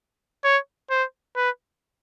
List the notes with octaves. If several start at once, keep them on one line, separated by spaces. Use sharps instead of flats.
C#5
C5
B4